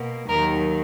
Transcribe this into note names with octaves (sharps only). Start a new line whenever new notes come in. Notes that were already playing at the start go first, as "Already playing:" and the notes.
Already playing: B2 A#3
D#2 D#3 F#3 A#4